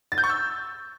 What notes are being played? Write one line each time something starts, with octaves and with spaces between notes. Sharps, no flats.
A6
G6
C#6
E6